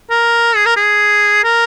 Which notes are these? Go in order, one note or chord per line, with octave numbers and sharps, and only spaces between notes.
A#4
G#4
A#4
G#4
A#4